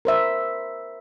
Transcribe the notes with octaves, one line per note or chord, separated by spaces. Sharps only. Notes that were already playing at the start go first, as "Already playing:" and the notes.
A#4 C5 E5